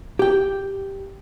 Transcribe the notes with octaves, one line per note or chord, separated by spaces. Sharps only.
G4 G5